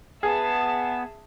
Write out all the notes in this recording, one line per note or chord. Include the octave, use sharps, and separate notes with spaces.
B3 G#4 E5 A5